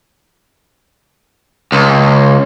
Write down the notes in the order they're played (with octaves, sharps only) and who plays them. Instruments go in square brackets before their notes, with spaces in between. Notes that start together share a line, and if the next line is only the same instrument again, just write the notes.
[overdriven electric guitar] C#2